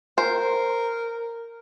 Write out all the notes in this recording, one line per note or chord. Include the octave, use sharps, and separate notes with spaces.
A#4 C5